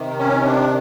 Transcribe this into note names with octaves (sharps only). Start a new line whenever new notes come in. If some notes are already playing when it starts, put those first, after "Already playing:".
Already playing: C3 D#3
C#4
D4